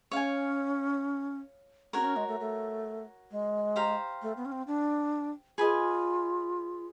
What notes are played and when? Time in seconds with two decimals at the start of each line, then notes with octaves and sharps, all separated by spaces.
0.11 C#4 C#5 F5 G#5
1.93 C#4 F#4 A#4 C#5
2.00 C4
2.05 C#4
2.16 G#3
2.27 A3
2.40 A3
3.31 G#3
3.76 G4 C5 F5 A#5
4.22 A3
4.36 B3
4.45 C#4
4.52 C4
4.67 D4
5.58 F4 G#4 B4 D#5 G#5